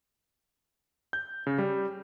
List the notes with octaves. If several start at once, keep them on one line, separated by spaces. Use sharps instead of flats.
G6
C#3
G3